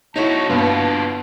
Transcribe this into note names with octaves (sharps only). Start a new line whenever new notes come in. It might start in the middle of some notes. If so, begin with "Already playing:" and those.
D#4 E4 F#4 A4 C#5 A5
G2 B2 B3 F4